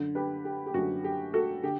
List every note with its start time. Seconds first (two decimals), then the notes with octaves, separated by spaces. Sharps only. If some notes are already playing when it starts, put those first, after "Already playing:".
Already playing: F#2 D3
0.15 G4 B4
0.45 G4
0.66 G4
0.74 F#2 D3 F#4
1.04 G4
1.34 F#4 A4
1.63 D3 G4